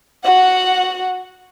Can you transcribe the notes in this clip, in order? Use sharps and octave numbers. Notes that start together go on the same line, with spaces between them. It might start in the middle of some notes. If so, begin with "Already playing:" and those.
F#4 F#5